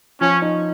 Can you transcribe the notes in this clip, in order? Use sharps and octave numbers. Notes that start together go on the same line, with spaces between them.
F3 C#4
D#4